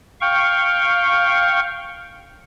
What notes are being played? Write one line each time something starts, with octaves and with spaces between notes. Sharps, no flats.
F5 G5 C#6